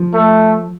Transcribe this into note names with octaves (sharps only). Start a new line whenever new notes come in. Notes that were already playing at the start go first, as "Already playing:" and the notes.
Already playing: F3
A3